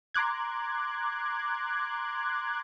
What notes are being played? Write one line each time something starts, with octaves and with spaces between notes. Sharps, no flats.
A#5 C6 D6 F#6 G#6